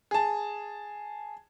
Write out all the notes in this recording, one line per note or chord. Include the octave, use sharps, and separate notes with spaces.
G#4 A5